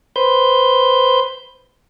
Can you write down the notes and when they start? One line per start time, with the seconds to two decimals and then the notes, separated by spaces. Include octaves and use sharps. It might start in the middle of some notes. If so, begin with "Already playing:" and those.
0.16 B4 C5 G6